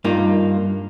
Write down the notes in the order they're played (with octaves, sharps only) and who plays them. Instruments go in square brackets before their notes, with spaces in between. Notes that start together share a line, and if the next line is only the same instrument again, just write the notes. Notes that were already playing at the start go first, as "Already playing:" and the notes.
[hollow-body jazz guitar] G2 A#3 D#4 F4